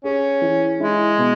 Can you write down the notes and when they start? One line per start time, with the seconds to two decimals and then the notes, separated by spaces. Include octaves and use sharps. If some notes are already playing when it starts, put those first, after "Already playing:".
0.04 C#4 G#4
0.42 E3
0.80 G#3 E4
1.18 B2